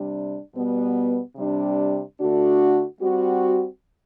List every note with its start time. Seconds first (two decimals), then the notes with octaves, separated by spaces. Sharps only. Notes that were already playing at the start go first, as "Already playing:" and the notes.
Already playing: C3 G3 D4
0.55 B2 G3 B3
1.36 C3 G3 D4
2.19 D3 A3 D4 F#4
3.01 G3 C4 F#4